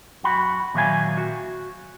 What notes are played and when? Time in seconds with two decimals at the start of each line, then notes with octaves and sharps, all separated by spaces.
0.23 F#2 F#4 B5
0.74 A#2 D#3 F#3 E5 F5 G#5
1.17 F#4